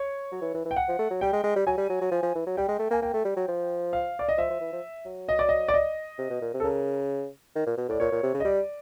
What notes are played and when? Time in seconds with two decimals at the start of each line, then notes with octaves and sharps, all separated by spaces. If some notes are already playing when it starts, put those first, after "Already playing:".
Already playing: C#5
0.32 F#3
0.42 E3
0.54 E3
0.65 E3
0.71 G5
0.76 F#5
0.88 F3
0.99 A3
1.11 F#3
1.21 G3 G5
1.33 G#3
1.44 G#3
1.56 G3
1.67 F#3 G#5
1.78 G3
1.90 F#3
2.01 F#3
2.12 F3
2.23 F3
2.35 E3
2.47 F#3
2.57 G3 G5
2.69 G#3
2.79 A3
2.91 A#3 G#5
3.02 A#3 G5
3.14 A3
3.25 G3
3.37 F#3
3.48 F3
3.93 F5
4.19 D5
4.29 D#5
4.38 F3 E5
4.50 F3
4.61 E3
4.73 F3
5.06 F#3
5.29 D#5
5.39 D5
5.49 D#5
5.68 D5
5.74 D#5
6.19 C3
6.30 B2
6.42 A#2
6.54 C3
6.60 A4
6.64 C#3 A#4
7.55 D#3
7.67 A#2
7.77 B2
7.89 A2 D5
8.00 A#2 C#5
8.12 A#2
8.23 C3
8.34 C#3
8.40 D#5
8.45 G3 D5